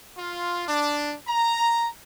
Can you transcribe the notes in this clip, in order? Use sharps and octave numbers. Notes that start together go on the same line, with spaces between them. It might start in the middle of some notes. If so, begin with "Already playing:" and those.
F4
D4
A#5